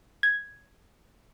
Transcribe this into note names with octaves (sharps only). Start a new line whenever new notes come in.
G#6